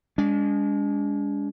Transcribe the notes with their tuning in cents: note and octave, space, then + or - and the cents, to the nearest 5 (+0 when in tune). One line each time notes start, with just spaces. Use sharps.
G#3 -25 D4 -45